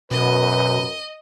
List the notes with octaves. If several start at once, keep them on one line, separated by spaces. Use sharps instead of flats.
F#2 B2 B4 D#5